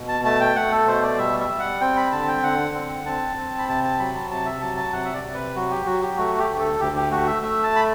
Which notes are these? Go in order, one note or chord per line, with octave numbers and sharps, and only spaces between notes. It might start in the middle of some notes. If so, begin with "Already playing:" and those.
Already playing: B2
A5
A3 A5
G5
A3 F#5
A4
B2 C5
D5
G3 E5
E5
G3
F#5
C4 G5
B5
D3 A5
G5
D3 F#5
C4
C4 A5
C4
B5
C3 A5
A5
F#3 B5
A5
C3 A5
E5
F#3 A5
A5
C3 F#5
E5
D5
C3
B4
F#3 F#4
G4
F#3 F#4
G4
A3 F#4
G4
D2
A4
D2 G4
G4
A3 F#4
E5
A3 E5
A5
B5